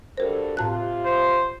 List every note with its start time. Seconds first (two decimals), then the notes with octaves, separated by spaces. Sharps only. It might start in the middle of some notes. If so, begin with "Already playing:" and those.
0.17 G2 F#4 A4 A#4 C5
0.57 A2 C3 C4 F4 A5 F#6
1.05 C5